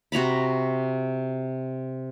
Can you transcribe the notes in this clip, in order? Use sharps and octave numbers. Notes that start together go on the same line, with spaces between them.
C3 F#4 A#5 B5